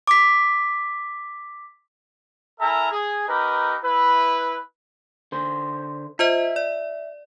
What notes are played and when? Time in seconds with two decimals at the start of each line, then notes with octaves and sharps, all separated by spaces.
0.07 D6 B6
2.61 E4 A4 A#4 E5 G#5 A#5
2.91 G#4
3.28 D#4 G4 A#4 B4
3.83 E4 B4
5.32 D3 C5
6.19 F4 C5 D#5 E5
6.56 D5